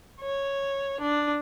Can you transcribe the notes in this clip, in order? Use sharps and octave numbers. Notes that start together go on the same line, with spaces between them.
C#5
D4